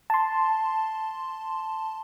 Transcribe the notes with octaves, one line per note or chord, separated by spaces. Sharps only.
A5 C6